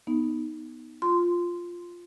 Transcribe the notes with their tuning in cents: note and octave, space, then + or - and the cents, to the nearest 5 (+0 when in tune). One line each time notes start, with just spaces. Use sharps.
B3 +0 D#4 +0
F4 +0 C6 -10